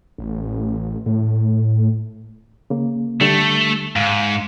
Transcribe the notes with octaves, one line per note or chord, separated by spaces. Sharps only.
A1
A2
C#3 A#3
D3 G3 A3
G#2 F5